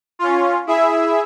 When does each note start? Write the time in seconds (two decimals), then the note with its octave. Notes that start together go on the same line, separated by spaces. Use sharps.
0.19 C#4 F4
0.67 E4 G#4 E5